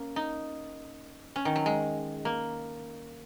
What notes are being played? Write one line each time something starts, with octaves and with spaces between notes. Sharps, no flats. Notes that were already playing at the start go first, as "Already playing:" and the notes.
Already playing: A#3 C#4
D#4
C#4
D#3
F#3
G#3
A#3